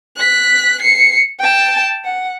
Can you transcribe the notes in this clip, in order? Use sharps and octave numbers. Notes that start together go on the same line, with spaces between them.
F#6 B6
C7 C#7
G5 A5
F#5